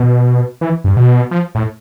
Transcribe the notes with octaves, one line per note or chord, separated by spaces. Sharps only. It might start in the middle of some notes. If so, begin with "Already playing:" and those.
Already playing: B2
E3
G2
B2
F3
A2